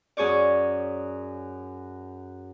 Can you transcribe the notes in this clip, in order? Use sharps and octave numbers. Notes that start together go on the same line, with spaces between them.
F#2 G#4 C#5 D5